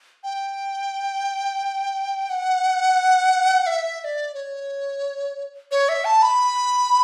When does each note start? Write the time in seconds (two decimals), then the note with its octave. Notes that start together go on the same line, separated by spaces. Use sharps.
0.24 G5
2.29 F#5
3.67 E5
4.00 E5
4.04 D5
4.34 C#5
5.71 C#5
5.89 E5
6.05 A5
6.22 B5